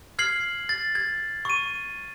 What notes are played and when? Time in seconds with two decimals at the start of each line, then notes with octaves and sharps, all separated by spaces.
0.19 F6 G#6 C7 F#7
0.69 A6
0.95 G#6
1.45 C#6 D#7